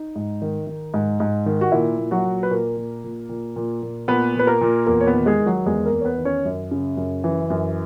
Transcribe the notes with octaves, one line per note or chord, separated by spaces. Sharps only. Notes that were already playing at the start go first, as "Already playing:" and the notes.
Already playing: D#4
G#2
D#3
D#3
G#2
G#2
D#3
F#4
A#2 E4
A#2
F#3 F#4
A#2
B4
A#2 A#3 A#4
A#2
A#2
A#2
A#2
A#2
A#2 B3 B4
A#2 B4
A#3 A#4
A#2
E2 A#3 A#4
C#5
B3 B4
D#3
G#3 G#4
D#3
F#3 F#4
E2 G#3 G#4
A#3 A#4
E2
C#5
B3 B4
D#3
C#4 C#5
F#2
C#3
F#2
E3
F#2